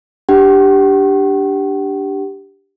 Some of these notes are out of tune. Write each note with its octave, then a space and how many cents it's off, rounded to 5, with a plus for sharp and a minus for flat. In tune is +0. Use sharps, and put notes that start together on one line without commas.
D4 +0 G4 +0 F#5 +40